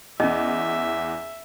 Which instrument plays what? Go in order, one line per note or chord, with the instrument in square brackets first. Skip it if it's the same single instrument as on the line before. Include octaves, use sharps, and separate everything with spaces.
[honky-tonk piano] E2 [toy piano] C#4 D#5 [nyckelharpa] E5